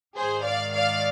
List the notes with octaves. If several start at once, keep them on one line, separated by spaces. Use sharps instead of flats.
G#2 D#3 G#4 C5
D5 F5
D5 F5